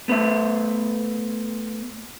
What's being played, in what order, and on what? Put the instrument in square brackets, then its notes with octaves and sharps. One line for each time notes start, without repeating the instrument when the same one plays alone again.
[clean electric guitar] A3 B3 C5 E5